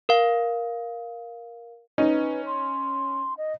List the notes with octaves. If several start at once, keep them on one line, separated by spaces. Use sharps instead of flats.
A#4 F5
C#4 D#4 B4 D#7
C6
D#5